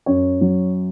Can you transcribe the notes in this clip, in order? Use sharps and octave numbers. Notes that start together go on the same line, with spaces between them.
F#2 C#5
F#3